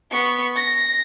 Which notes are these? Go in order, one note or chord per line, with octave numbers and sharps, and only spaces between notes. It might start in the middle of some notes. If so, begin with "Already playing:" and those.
B3 C#6
A#6